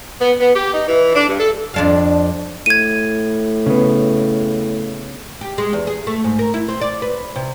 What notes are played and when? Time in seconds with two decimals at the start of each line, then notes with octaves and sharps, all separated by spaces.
0.20 B3
0.40 B3
0.55 G4
0.74 D#4
0.88 E3
1.15 D4
1.28 G2
1.40 A4
1.74 F2 D4 F5
2.66 A2 G#6 D#7
3.66 C#3 B3
5.41 G4
5.58 G#3
5.73 E2
5.87 G#4
6.07 A3
6.24 G#2
6.39 A#4
6.54 E4
6.68 C4
6.81 D5
7.02 B4
7.36 C3